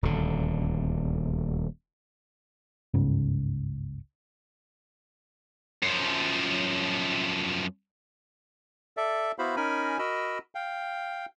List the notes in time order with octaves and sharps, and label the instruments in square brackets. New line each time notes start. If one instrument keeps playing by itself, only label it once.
[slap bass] D#1 D2 D3
[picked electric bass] G1 C#2 G#2 C#3
[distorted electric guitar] F#2 F3
[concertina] A4 D5 E5
B3 E4 F#4 C5 F5 B5
C#4 D#4 A#4 G#5 B5
F#4 A#4 D#5 B5 E6
F5 G5